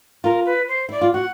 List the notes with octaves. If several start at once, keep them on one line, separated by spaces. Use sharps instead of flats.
F4 A#4
B4
C5
E4 D5
F4
F#4 F#5